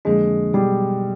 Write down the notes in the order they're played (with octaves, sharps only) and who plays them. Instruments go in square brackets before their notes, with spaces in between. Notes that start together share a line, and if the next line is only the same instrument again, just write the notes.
[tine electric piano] F2 D3 F3 A#3 D4 [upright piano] G#3
[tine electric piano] B2 F#3 B3 D#4 [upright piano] G3